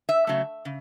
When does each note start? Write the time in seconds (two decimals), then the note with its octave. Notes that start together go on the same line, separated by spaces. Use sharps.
0.09 E5
0.27 C#3 F#3 A3
0.65 C#3